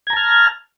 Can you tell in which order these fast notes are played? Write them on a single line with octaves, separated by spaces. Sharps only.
G#6 A#5 A5 F6